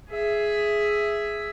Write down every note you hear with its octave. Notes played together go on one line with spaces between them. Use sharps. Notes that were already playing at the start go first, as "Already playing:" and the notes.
G#4 E5